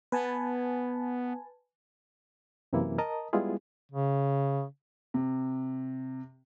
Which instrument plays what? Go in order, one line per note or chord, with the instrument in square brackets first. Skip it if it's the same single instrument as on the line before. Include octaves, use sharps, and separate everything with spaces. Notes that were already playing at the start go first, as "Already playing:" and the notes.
[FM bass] B3 [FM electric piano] B4 G#5 A5
[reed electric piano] F#2 C3 E3 A#3 E4
A#4 D#5 A5 A#5 D#6
G3 G#3 B3 E4 F4 G#4
[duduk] C#3
[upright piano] C3